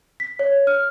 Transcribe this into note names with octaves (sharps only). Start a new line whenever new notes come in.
B6
C#5
F6